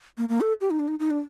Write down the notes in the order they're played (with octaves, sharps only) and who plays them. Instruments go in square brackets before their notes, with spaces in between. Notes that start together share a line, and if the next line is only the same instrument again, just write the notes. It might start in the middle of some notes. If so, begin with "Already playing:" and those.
[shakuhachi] A#3
A#3
A4
G4
D#4
D4
D#4
D#4
D4